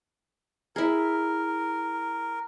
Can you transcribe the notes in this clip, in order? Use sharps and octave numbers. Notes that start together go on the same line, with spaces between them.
E4 G#4 A#4